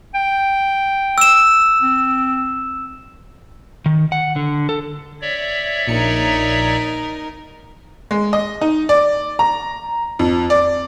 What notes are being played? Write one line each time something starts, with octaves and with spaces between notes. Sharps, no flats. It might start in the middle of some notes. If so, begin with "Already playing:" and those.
G5
E6 E7
C4
D#3
F#5
D3
A4
C#5 D5 E5
A#1 D#4 A#4 C#7
G#3
D#5
D#4
D5
A#5
F2
D5